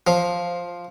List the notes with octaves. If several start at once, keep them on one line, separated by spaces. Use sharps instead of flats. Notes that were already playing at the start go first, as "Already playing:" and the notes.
F3